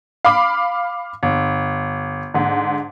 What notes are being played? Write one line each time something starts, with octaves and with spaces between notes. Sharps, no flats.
F5 B5 D6
G1
G#2 D3